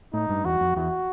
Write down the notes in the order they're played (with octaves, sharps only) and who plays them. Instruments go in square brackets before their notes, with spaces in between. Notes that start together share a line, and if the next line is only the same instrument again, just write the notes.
[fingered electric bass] A2 [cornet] D#4
[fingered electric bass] G2
[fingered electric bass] E2 [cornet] F#4
[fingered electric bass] F2
[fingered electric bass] E2 [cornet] F#4